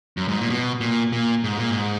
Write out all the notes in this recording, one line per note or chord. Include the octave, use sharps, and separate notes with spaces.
F#2
G#2
A#2
B2
A#2
A#2
G#2
A#2
G#2